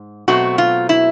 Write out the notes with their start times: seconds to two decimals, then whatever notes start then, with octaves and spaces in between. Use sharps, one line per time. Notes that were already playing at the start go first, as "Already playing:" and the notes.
Already playing: G#2
0.28 B2 F#3 A3 C4 F#4
0.58 F4
0.89 E4